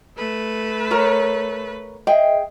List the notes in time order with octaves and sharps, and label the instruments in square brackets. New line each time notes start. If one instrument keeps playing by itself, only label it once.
[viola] A3 B4
[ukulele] A#4 C#5
[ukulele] G#4 G5 [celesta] D#5 E5